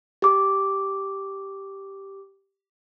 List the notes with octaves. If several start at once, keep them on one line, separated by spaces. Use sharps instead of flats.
G4 D6